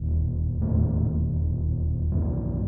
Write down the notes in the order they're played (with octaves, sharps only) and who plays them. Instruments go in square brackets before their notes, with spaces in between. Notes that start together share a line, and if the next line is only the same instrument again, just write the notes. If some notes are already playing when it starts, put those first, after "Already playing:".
Already playing: [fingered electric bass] E1 D#2
E1 D#2 A2 A3
E1 D#2
B1 G2 B2 G3